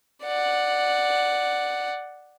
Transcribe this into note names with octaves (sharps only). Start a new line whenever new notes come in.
D5 F#5